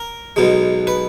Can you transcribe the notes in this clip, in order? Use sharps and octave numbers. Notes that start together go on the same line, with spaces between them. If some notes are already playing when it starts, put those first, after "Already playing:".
Already playing: A#4
B1 B2 G#3
B4